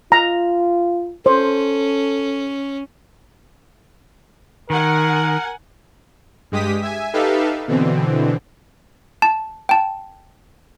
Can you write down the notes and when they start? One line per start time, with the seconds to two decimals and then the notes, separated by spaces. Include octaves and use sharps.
0.12 F4 A#5
1.26 C#4 A4 C5
4.70 D#3 A#4 F#5 G#5
6.52 G2 G#3 G4 D#6 B6
6.82 E5 G#5
7.13 D#4 G4 A4 B4 E5 F5
7.68 B2 D3 E3 C4
9.22 A5
9.69 G5 A5